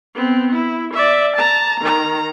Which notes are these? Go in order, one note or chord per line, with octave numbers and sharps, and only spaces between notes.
B3 C4
E4
D5 E5
A5 A#5
D#3 A#5